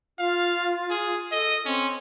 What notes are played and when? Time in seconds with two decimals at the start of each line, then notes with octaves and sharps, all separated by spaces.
0.19 F4 F5
0.90 G#4
1.32 A4 D#5
1.66 C4 C#4